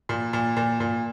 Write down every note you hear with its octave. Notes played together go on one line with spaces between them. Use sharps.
A#2
A#2
A#2
A#2